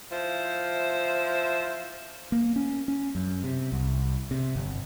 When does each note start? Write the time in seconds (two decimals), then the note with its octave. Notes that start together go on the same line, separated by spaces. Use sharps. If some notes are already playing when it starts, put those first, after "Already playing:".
0.11 F3 E4 C5
2.32 A#3
2.56 C#4
2.88 C#4
3.15 F#2
3.44 C3
3.72 C2
4.31 C3
4.56 G1